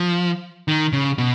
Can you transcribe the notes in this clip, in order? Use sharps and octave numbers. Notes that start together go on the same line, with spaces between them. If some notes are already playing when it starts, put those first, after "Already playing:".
Already playing: F3
D#3
C#3
B2